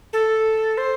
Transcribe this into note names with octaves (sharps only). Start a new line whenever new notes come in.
A4
C5